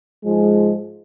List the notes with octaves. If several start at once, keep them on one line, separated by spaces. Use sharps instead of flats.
G#2 F3 G#3